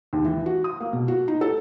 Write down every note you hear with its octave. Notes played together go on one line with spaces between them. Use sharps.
D#2
E3
F#4
D#6
A#3
B2
F#4
D#4
A4